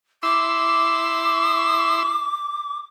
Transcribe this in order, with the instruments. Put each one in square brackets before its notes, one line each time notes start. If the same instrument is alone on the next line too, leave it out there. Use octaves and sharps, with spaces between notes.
[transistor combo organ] E4 C6 E6 [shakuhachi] D6